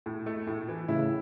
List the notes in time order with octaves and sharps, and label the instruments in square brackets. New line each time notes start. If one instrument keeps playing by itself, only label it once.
[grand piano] A2
A3
A2
E3
[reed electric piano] A2 C#3 [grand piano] E4